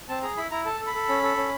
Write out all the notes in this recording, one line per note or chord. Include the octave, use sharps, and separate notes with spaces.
C4 A5
G#4 A#5
E4 B5
E4 A#5
A4 A5
A4
B5
A4
C#4
A4
C#4